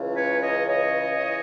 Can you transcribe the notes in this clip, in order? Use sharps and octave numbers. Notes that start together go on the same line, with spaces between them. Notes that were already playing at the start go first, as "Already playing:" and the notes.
Already playing: C#2 C#3 E3
B4 C#5
C#5 D#5
C#5 D#5
C#3 E3